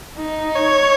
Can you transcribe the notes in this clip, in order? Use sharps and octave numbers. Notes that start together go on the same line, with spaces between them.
D#4
C#5